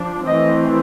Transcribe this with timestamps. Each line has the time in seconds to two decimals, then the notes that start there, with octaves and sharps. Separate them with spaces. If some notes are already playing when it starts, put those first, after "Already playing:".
Already playing: F3 D4
0.26 E3 A3 C4 D#5